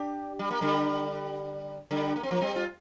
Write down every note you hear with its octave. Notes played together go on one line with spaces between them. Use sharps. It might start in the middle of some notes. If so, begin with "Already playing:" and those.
Already playing: D4 G4
G3
A#3
D3 G3
D3 G3
A#3
C4
F3 A#3
G3 C4
F4